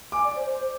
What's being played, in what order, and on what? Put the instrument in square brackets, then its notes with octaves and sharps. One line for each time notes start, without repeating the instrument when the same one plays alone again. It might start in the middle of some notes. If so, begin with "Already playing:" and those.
[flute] G#5 [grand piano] D6
[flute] D5
C5
C5